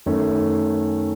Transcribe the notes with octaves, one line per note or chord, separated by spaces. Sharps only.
F#2 D#3 A3 C#4